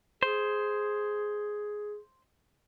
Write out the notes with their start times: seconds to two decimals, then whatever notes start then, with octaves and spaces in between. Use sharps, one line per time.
0.23 G#4 C5